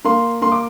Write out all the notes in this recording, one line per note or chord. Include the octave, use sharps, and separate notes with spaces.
A#3 C6
A#3 C6
D6